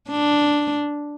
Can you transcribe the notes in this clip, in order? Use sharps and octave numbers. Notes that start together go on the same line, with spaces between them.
D4